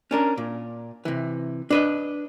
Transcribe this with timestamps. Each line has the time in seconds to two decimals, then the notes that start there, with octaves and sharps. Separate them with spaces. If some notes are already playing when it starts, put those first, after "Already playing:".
0.11 C#4 D4 A#4
0.37 A#2
1.05 C3 E3
1.70 D4 B4 D#5